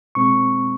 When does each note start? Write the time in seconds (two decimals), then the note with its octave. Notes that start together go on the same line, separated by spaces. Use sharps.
0.15 B2 G#3 C4 C#6